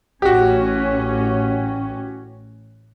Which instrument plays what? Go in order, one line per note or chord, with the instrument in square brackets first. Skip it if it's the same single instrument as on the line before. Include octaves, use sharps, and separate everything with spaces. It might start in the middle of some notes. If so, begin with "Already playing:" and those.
[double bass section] A1 C#4 [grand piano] F#4 G4